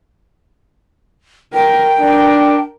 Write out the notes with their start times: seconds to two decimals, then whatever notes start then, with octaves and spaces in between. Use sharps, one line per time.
1.54 A#4 G5
1.99 D4 A#4